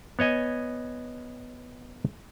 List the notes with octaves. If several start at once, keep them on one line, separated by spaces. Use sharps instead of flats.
B3 C#5 D#5 G#5